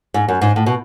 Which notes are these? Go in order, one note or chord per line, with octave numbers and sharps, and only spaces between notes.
G#2
F#2
G#2
A2
B2